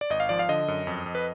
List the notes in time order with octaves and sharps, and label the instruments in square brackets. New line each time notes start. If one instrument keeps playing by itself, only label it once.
[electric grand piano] D5
G#1 D#5
F5
F3 D5
F5
D3 D#5
F#2
F2
F2
B4